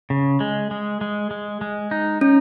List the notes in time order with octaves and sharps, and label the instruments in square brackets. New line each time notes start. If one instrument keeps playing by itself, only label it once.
[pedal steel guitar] C#3
G#3
G#3
G#3
G#3
G#3
D#4
[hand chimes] C#4 [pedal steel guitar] D#4